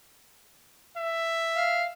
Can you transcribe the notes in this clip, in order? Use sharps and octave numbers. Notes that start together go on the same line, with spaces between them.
E5
F5